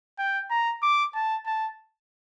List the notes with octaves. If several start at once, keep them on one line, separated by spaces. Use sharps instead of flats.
G5
A#5
D6
A5
A5